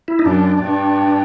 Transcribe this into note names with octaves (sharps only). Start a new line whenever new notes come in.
E4
D#4
F#2 D4
G2